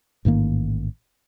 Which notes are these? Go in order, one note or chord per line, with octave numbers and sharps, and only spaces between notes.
A1 G#2 D#3 A#3